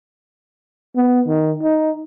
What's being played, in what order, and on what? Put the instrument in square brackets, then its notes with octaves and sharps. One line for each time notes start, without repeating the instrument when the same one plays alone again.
[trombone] B3
D#3
D#4